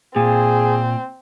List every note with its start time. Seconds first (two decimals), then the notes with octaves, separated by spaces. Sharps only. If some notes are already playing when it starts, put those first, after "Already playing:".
0.16 A#2 C4 G#4